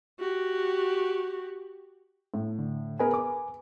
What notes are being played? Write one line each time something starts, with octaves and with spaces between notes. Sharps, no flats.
F#4 G4
A2
D3
B3 G#4 A#4 B4 G#5
D6